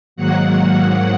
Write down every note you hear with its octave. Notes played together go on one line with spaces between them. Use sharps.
G#2 D#3 F#3 A#3 F#5